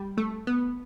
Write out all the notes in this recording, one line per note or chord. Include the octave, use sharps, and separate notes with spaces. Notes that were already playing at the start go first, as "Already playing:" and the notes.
Already playing: G3
A3
B3